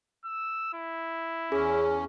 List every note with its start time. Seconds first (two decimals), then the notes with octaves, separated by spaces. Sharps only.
0.25 E6
0.74 E4
1.52 E2 C#4 G#4